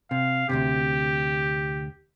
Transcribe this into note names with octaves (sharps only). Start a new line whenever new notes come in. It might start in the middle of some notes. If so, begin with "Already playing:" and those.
C3 F5
D2 A2 C3 G4